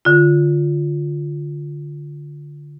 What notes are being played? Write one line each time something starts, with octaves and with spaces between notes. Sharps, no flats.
D3 F4